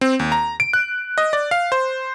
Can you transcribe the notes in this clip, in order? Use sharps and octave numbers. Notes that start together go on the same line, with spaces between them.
C4
D#2
A#5
D7
F#6
D#5
D5
F5
C5